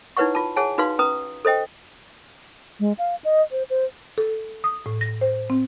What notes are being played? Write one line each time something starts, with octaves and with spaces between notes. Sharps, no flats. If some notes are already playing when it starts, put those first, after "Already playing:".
D#4 E4 B4 C#5 F#5 C#6
F4 A5
G#4 C#5 F#5 G#5 A5
D#4 F#4 B4 F5 C6
C#4 B4 A#5 D#6
A4 C5 D#5 G5
G#3
F5
D#5
C5
C5
A4
D#6
A2
A#6
C5
C4